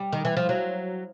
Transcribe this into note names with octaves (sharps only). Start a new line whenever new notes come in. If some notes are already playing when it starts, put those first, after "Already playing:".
Already playing: G3
D#3
E3
F3
F#3